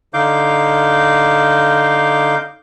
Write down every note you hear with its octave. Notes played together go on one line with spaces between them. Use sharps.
D3 D#4 F5 D6 G6